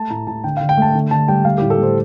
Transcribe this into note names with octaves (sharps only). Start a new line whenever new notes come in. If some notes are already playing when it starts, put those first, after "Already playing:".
Already playing: A3 A5
A2 A#5
A2 A5
D3 G5
D3 F5
G5
A3 A5
D3
D3 A5
G3 G5
A3 F5
A2 G4
A4
A2 C5